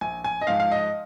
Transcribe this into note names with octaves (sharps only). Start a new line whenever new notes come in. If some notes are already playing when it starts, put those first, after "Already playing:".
A#1 G#5
G#5
D#5
G#2 F3 F5
F5
D#5